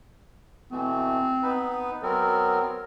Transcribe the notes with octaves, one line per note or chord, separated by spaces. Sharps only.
B2 E3 A3 C4
B3 D#4 B4
F#3 B3 C4 A#4